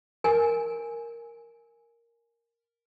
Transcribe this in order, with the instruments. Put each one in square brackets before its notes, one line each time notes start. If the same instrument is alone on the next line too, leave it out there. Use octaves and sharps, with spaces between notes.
[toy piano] A#4 G#5